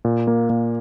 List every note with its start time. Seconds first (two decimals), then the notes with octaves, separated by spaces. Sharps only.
0.05 A#2
0.27 A#3
0.50 A#2